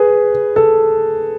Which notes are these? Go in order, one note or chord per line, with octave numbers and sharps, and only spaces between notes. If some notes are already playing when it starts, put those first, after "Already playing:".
Already playing: G#4 B4
A4